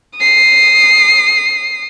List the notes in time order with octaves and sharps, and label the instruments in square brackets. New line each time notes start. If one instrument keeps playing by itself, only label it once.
[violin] D#6 C7